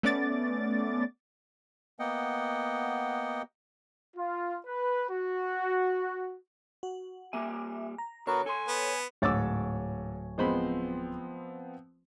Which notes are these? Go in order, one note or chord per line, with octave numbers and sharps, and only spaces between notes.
A3 B3 C#4 D5 D6 A6
A#3 B3 D#5 F#5 G5
F4
B4
F#4
F#4
G3 A#3 E5 G#5
A#5
D3 B3 F#4 A#4 C#5
A4 G#5 C6
B3
D1 G#2 C#5 D6 E6 A6
F3 G#3 B3 C4 C5 B5